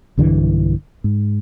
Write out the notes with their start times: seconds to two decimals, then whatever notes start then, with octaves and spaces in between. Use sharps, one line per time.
0.17 B1 G2 D3 E3
1.04 G#2